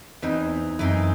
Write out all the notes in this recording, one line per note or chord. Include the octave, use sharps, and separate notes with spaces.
E2 E3 C4 D#4
F#2 E3 C4 D#4